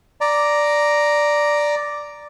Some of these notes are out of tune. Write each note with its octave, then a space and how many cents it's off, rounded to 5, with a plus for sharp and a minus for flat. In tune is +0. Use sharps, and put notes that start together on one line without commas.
D5 +0 A#5 +0